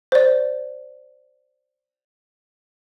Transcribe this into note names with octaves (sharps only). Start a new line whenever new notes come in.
C5 D5